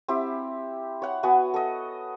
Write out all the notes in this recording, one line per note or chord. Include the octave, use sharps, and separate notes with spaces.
C4 E4 G4
C#5 F#5
B3 F#4 G#5
A4 D#5